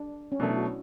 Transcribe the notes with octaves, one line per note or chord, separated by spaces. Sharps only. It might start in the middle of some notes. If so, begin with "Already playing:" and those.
Already playing: D4
C#4
B2 F#3 A3 D4
E4
F#4